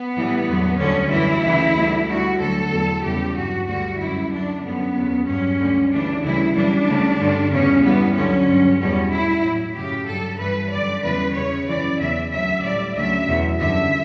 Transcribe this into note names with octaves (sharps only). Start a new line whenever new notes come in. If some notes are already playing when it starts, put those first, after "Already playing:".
Already playing: B3
A2 E3 G3
E2 D3 F#3
D2 D3 G3 C#4
F#2 E3 G3 E4
D2 C#3 E3
D2 D3 G3
D2 D3 G3 F#4
D2 D3 F#3 A4
E2 B2 F#3
E2 C#3 E3 G3 G4
G2 F#3 F#4
D2 D3 G3 F#4
F#2 E3 G3 E4
F#2 D3 F#3 D4
F#2 D3 G3 B3
E2 C#3 F#3
G2 F#3 C#4
D2 D3 G3
D2 C#3 E3 G3 D4
D2 C#3 E3 G3 E4
F#2 E3 G3 D4
D2 C#3 G3
G2 D3 G3
E2 C#3 G3 C#4
G2 E3 G3 B3
D2 D3 F#3 C#4
G2 F#3
E2 B2 G3 C#4
A2 G3 E4
A2 F#3
F#2 C#3 F#3 G4
G2 F#3 A4
G2 E3 G3 B4
F#2 D3 G3 D5
E2 C#3 E3 G3 B4
E2 C#3 G3 C#5
F#2 C#3 E3 D5
E2 C#3 F#3 E5
D2 C#3 F#3 E5
A2 G3 D5
D2 C#3 F#3 E5
E2 B2 F#3
F#2 D3 G3 E5